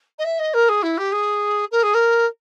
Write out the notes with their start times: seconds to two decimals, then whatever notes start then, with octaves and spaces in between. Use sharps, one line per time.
0.18 D#5
0.24 E5
0.39 D#5
0.53 A#4
0.68 G#4
0.82 E4
0.97 G4
1.12 G#4
1.71 A#4
1.82 G#4
1.94 A#4